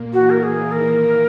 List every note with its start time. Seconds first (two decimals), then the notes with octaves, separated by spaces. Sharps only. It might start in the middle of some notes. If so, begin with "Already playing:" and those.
Already playing: A#2 A#3
0.13 E3 F#4
0.30 A#4
0.42 E3 G#4
0.71 D#3 A#4